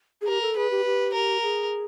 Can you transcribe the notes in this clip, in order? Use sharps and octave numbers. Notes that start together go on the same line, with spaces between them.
G#4
G4 A#4
A4
G#4 B4
G4
G4
A#4
G#4